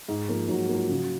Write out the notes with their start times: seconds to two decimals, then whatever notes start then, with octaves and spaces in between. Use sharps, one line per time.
0.08 G#2
0.28 F3 A#3
0.49 G#2 F#3
0.69 F3 A#3
0.89 C#3